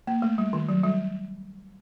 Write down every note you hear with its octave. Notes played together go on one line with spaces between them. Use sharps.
A#3
A3
G3
D#3
F#3
G3